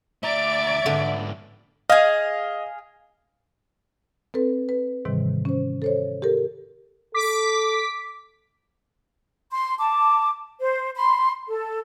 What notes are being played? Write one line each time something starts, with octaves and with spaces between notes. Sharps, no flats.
D2 D5 E5 A#5 D7
G#2 D3 B3
G#4 D#5 F5
C4 A4 B4
B4
G#2 C3 D#3 E3 G3
C#4 C5
A4 C5 C#5
G4 A4 A#4
A4 D6 B6
C6
A5 D6
C5
B5 C6
A4